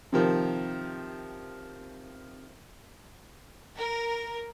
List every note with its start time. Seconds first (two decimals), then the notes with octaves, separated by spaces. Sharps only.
0.12 C3 D#3 F3
3.78 A#4